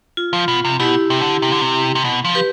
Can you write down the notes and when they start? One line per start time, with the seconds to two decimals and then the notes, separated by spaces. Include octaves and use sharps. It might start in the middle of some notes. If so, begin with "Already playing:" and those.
0.17 F4
0.33 F3
0.48 B2
0.65 C3
0.80 B2 E4 G4
1.10 C3
1.21 D3
1.42 C3
1.52 D3
1.61 C3
1.95 C3
2.04 B2
2.25 F3
2.35 G4 B4